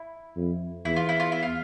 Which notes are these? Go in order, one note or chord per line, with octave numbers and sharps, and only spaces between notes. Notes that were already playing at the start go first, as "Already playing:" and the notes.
Already playing: E4
F2
E2 E4
F4
E4
F4
E4
F4